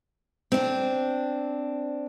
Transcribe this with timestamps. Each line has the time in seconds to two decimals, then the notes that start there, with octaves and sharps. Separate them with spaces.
0.52 C4 D4